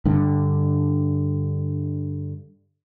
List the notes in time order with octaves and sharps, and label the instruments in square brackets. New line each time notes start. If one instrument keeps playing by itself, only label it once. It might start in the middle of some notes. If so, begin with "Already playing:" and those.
[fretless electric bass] G2 D3